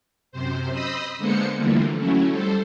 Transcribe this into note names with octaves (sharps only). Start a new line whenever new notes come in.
F#2 C3 C5
C5 D#5 B5 D#6 E6
D3 G#3 A#3 B3 C5 C#7
D3 E3 F3 G3 A3 A#3
F#3 A3 C#4 E4
G3 A4 C5